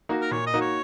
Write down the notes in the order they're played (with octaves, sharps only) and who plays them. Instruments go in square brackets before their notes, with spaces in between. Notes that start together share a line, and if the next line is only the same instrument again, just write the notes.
[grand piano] A#3 D#4 F#4
[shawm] A#4
[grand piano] A#2 [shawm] C#5
[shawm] D#5
[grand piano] A#3 D#4 F#4
[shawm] C#5